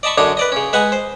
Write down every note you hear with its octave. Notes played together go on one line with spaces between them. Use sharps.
D5 D#5 A5 B5 C#6
F#2 D3 D4 C#5 D#5
B4 D5 D#5
C#3 C#4
G#3 B4 D#5 F#5 G#5
C5